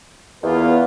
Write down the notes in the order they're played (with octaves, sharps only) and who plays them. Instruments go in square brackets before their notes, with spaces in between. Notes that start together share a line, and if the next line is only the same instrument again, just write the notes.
[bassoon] E2 [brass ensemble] A#3 B3 F4